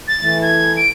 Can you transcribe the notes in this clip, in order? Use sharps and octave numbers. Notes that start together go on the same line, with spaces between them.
A6
E3 A3
G#6
D7